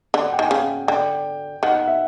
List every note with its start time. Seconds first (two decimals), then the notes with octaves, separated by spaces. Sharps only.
0.14 D3
0.24 F#5
0.33 G5
0.39 D#3 G#5
0.51 C#3
0.88 D3 G5
1.63 D#3 F#5
1.75 F#5
1.88 E5